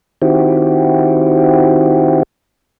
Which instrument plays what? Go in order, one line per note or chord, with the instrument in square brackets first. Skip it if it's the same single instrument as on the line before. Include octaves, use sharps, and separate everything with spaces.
[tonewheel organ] D#3 C4 E4 F#4 G4